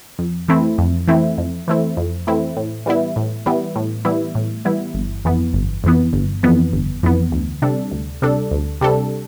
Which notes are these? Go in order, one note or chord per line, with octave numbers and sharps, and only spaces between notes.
F2
E3 A3 C4 E4
F2
E3 A3 C4 E4
F2
E3 A3 C4 E4
F2
E3 A3 C4 E4
A2
E3 G3 B3 E4
A2
E3 G3 B3 E4
A2
E3 G3 B3 E4
A2
E3 G3 B3 E4
G1
F2 E3 B3
G1
F2 E3 B3
G1
F2 E3 B3
G1
F2 E3 B3
D2
C3 G3 D4 A4
D2
C3 G3 D4 A4
D2
C3 G3 D4 A4